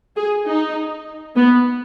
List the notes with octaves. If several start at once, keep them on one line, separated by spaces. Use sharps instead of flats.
G#4
D#4
B3